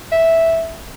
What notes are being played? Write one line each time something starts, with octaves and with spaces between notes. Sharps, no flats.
E5